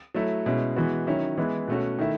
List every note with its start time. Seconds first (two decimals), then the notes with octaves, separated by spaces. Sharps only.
0.15 F#3 A3 E4
0.46 B2 G#3 C#4 E4
0.76 E3 G#3 B3 F#4
1.07 D#3 F#3 C#4 E4
1.37 E3 G#3 B3 E4
1.68 B2 A3 C#4 F#4
1.99 D#3 A3 E4